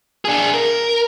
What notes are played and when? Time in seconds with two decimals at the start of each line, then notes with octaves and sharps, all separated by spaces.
0.25 D4 G#4
0.54 A#4